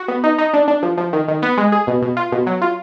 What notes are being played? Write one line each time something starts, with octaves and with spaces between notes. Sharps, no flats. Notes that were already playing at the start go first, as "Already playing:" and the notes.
Already playing: F#4
B3
D#4
D#4
D4
D4
F3
F3
D#3
D#3
B3
G#3
G#4
B2
B2
F4
B2
F#3
F4